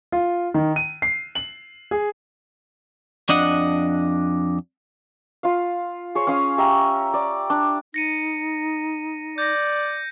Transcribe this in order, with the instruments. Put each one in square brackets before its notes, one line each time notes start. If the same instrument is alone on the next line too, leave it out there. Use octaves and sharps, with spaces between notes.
[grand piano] F4
D#3
D#7
C7
F#7
G#4
[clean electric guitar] F2 D4 D#5 F#5
[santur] F4 F5
G#4 C5 C#5
C#4 G#4 F5 D#6
G4 E5 G5 A#5
D5
D4
[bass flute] D#4 [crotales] A#6 C#7 D#7
[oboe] D5 [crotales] G6 A#6